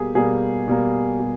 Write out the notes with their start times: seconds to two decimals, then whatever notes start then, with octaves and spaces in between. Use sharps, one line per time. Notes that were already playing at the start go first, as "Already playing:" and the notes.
Already playing: B2 G3 A#3 G4 G#4
0.15 B2 G3 A#3 G#4
0.68 B2 G3 A#3
1.20 B2 G3